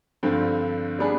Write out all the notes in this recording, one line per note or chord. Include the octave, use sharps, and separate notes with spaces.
G2 D3 F3 C4
G3 B3 D4 G#4